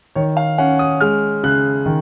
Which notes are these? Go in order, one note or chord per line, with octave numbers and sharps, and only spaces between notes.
D#3 C#5
F5
C#4 F#5
D#6
G#3 F6
C#3 F#6
D#3